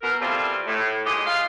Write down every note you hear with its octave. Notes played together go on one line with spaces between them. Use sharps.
B2 A#4
E3 F3 G3 A3 C4 F4
A2
A#2 G#3 G4 D#5
F4 F5